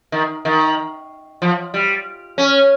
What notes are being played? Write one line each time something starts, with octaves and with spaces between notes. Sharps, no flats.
D#3
D#3
F3
G3
C#4